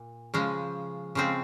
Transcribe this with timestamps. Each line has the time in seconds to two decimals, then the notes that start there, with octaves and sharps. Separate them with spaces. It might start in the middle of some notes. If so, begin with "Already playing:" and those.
Already playing: A#2
0.34 C#3 F3 G#3
1.15 C#3 F3 G#3 C4